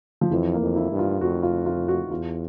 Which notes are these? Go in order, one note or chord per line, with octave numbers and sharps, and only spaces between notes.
F3
F2 E3
A#3
F2
E4
G2
F4
F2 F#4
F4
F4
F#4
E2 F4